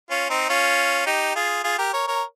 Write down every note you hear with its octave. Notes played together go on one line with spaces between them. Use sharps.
C#4 F4
C4 D#4
C#4 F4
D#4 G4
F4 G#4
F4 G#4
G4 A#4
A#4 C#5
A#4 C#5